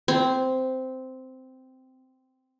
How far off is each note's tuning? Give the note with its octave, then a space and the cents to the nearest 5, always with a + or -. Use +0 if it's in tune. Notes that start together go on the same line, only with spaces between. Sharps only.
C4 -10